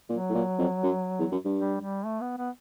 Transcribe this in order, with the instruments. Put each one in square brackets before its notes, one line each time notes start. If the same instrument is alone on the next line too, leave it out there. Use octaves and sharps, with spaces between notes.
[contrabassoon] A#2 [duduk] F#3
[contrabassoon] A2
A#2
F2
F#2
E2
F#2
G2
[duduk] G3
G3
A3
B3
B3